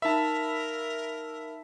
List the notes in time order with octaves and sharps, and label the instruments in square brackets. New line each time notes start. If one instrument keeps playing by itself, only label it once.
[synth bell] D#4 F5 B5 [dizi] A#4 [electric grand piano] E5 A5